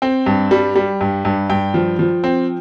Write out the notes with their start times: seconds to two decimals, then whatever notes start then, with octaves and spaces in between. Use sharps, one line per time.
0.02 C4 G5
0.26 G2
0.51 G3
0.76 G3
1.01 G2
1.25 G2
1.50 G2 G5
1.74 F3
1.99 F3
2.24 C4